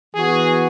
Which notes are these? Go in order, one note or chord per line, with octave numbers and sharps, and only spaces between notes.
E3 B3 F#4 G#4